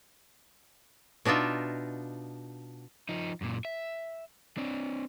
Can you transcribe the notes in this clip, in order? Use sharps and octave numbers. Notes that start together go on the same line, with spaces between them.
B2 D4 D#4 F4 E5
F3 D#4
F#2 A#2
E5
C4 D4